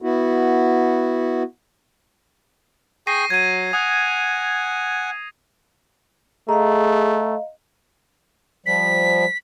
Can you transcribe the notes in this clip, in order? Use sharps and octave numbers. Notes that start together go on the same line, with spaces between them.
B3 E4 F#4
G#4 G5 C#6 A#6 C7 D#7
F#3 G#6 D#7
F#5 G#5 D#6
A3 G#4 D#5 F5 A#5
F3 G3 B6